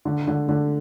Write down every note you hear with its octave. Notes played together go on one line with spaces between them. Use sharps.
D3
D3
D3